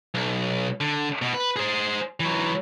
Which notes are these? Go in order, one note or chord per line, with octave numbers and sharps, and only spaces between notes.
B1
D3
B2
B4
G#4 C5
E3 F#3